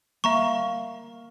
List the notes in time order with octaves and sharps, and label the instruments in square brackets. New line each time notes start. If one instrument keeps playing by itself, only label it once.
[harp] A#3 [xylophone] E5 A#5 C#6